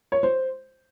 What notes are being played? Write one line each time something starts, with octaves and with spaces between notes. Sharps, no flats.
C#5
C5